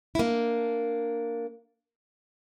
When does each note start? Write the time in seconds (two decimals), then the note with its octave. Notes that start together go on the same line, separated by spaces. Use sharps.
0.15 E4
0.18 A#3 D4